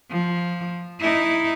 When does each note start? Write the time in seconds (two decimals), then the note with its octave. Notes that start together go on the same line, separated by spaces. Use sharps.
0.11 F3
1.00 D#4 E4